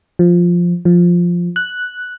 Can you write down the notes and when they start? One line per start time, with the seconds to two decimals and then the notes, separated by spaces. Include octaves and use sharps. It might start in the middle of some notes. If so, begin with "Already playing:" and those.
0.19 F3
0.85 F3
1.56 F#6